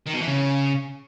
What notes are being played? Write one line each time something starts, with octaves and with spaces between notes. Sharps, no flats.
D#3
B2
E3
C#3